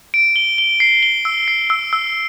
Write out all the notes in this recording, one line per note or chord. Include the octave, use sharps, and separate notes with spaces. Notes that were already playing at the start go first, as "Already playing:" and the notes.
D7
G7
G7
C7
G7
E6
C7
E6
E6